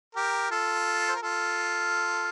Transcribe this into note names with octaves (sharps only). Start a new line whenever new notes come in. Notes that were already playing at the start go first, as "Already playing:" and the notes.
G4 A#4
F4 A4
C5
A#4
F4 A4